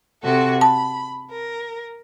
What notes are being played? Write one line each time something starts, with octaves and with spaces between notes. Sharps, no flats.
C3 F#4 A4
A5 B5
A#4